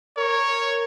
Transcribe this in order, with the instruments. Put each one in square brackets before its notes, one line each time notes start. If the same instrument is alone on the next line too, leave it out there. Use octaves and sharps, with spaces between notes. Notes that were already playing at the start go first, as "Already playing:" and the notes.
[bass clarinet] A#4 [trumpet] C#5